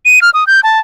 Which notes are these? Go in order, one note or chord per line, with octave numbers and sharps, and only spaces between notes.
D#7
F6
D#6
G6
A5